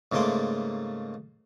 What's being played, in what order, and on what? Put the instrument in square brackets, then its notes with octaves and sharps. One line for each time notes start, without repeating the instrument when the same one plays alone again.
[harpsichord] G#2 C#3 A3 A#3 C6 D6